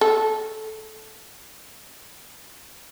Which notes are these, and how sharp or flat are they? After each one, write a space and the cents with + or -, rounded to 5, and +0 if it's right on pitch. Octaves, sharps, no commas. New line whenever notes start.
A4 -15